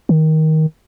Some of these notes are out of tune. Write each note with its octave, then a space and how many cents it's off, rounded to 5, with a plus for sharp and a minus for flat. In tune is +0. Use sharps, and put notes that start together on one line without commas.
D#3 +15